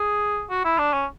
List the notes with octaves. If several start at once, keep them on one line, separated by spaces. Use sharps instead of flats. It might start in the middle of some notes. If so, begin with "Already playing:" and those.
Already playing: G#4
F#4
E4
D4
C#4